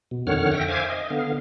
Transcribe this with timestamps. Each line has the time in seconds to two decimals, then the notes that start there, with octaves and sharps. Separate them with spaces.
0.11 B2
0.27 F2 D3 D#3 C#5 F#5 F6
0.51 E5 G5 A#6
0.68 C5 E5 F5 G#5 D6 G#6
0.89 D#5
1.10 D3 B3 F5